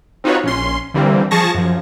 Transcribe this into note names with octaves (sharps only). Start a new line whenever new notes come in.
C4 D#4 F4 F#4 B4 C#5
A#1 C#4 C6
D3 E3 G3 A#3 C4
F3 G#4 A5 C#6 A#6
F#2 F3